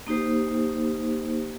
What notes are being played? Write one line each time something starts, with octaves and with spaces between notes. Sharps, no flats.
A#3 D#4 G4 C5